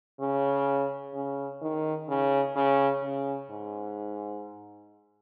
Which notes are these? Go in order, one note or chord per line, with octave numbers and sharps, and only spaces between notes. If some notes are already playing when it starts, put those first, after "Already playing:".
C#3
C#3
D#3
C#3
C#3
C#3
G#2